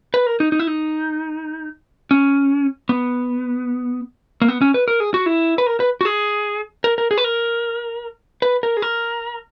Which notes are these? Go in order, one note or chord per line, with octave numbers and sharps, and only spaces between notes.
B4
A#4
D#4
D#4
E4
D#4
C#4
B3
A#3
B3
C#4
B4
A#4
G#4
F#4
E4
B4
A#4
B4
F#4
G#4
A#4
A#4
G#4
B4
A#4
B4
A#4
G#4
A#4